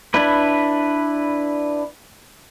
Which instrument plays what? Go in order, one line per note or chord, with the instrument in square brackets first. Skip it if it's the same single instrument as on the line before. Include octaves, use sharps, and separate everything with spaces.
[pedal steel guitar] D4 E4 B4